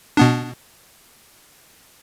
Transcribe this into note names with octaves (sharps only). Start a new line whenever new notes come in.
B2 B3 D4